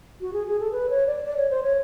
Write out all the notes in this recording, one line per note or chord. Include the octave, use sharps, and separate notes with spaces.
F#4
G#4
G#4
A4
B4
C#5
D5
D5
C#5
C5
C#5